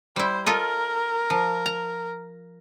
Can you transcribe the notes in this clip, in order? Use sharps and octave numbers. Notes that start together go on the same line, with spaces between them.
G3 E4 C5
F4 A4 A#4 D#5
F3
A#5